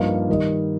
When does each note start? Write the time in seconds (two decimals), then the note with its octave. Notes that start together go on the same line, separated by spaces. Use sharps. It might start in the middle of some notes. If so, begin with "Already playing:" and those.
Already playing: G2 F3 A#3 D#4
0.29 D#3 G3 D#4 A#4 D#5